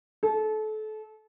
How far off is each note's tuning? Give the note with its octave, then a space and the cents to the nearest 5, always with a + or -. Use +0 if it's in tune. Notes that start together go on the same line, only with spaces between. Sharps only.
A4 -30